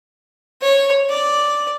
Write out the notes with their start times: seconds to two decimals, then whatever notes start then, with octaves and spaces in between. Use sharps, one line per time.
0.62 C#5
1.10 D5